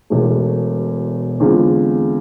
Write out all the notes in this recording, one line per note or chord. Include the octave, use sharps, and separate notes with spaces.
E1 E2 B2 A3
E2 D3 G#3 C4 F4